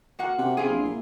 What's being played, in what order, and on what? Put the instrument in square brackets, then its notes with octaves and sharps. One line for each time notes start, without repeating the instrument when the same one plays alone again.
[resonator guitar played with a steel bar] A#3 F#4 F#5
[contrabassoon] C3
[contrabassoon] C3 [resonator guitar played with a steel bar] E4 F4 G#4
[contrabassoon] A#1
A#2